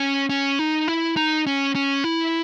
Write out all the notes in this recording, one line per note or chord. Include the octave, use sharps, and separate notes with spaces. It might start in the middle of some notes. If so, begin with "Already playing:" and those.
Already playing: C#4
C#4
D#4
E4
D#4
C#4
C#4
E4